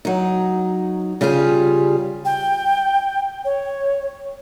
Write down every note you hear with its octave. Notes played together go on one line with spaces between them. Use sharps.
F#3 D#4
C#3 G3 F4 G4 G#4
G5
C#5